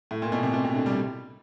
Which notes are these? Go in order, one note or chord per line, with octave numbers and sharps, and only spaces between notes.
A2
A#2
B2
C3
B2
C3
D3
G3